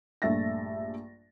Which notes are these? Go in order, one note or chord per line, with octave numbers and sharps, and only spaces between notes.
A#1 G2 A3 E5 A6 A#6